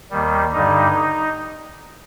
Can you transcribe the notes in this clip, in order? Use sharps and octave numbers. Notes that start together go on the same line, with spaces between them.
D#2 D#3 G3
G2 D3 G3 D#4